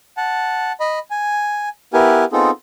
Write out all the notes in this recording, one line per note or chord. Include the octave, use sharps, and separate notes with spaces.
F#5 A5
D#5 B5
G#5
B3 E4 G4 A#4 B4 G#5
B3 C4 D#4 F4 G#4 A4